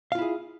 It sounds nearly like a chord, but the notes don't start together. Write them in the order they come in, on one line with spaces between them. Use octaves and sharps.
F5 F4 E4 G#4